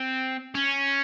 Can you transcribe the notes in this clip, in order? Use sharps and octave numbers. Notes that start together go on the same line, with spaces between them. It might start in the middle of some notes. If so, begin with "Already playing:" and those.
Already playing: C4
C#4